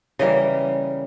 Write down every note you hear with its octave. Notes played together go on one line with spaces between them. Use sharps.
C#3 E3 G3 A#3 D#5